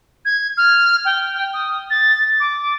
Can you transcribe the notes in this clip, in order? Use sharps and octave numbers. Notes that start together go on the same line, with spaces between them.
G#6
F6
G5
D#6
A6
D6